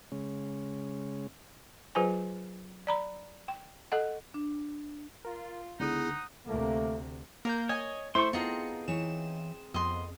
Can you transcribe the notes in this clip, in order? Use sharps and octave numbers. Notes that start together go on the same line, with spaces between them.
C#3 G#3 C#4
F#3 F4 G#4 B4 C5 G#5
D5 A#5 B5
G5
A4 D#5 F#5
D4
F4 A#4
C#2 D3 B3 D#4 E4 G#4 F#5 D#6
D2 C3 A3 A#3
A#3 A#4 A#5 G6
C#5 D#5 G#5
A3 E4 C5 C6 C#6
B3 C4 D#4 F4 G#4 A4 A#5 C#7
E3 C#5 E7
F2 B3 D#5 C6